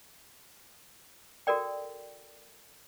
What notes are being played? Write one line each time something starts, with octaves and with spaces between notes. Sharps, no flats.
F#4 A4 A#4 D5 G5